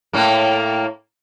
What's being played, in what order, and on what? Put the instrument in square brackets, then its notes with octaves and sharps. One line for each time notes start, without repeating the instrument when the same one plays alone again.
[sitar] A2 A#3